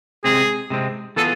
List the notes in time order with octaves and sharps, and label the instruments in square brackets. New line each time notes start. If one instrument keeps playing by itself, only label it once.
[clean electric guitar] C3 G#3 C4 [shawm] G#4
[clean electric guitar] C3 G#3 C4
[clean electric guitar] E3 B3 F4 G#4 [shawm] A4